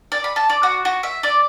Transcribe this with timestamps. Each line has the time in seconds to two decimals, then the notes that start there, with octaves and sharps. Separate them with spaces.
0.12 D5
0.24 B5
0.36 A5
0.50 D5
0.63 F#4
0.85 F#4
1.03 E5
1.23 D5